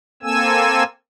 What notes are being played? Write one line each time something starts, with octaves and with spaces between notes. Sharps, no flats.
A#3 C4 A4 G#5 E6